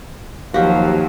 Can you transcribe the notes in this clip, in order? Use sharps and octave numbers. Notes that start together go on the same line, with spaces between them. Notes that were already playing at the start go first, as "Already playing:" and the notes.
D#2 F3 F#3 F#4 G4 F5